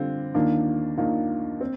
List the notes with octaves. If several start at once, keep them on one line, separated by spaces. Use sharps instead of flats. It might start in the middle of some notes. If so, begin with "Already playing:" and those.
Already playing: D3 G3 C4 F4
D#2 D#3 A#3 D4 F4
D#2 D#3 A#3 D4 F4
C4